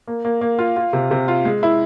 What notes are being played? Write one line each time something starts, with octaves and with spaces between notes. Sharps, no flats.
A#3
A#3
A#3
F4
F4
C3
C3
F4
G#3
E4